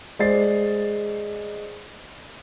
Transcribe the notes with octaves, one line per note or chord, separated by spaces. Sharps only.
G#3 C5 D5 A6 C7